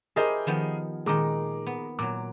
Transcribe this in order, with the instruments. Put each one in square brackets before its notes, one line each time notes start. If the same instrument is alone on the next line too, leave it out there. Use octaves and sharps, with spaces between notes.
[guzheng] E4 G4 C5 [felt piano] G#4 A#4 D#5
[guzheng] D#3 F3 B3
[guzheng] A#2 D#3 [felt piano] G#3 A#5 D6
[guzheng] B3
[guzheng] A#2 F#3 [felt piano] D6